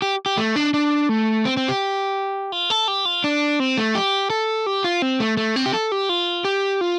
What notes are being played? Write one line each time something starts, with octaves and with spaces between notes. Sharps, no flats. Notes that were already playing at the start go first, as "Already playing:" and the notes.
G4
G4
A3
D4
D4
A3
C4
C4
G4
F4
A4
G4
F4
D4
C4
A3
G4
A4
G4
F4
C4
A3
A3
C4
G4
A4
G4
F4
G4
F4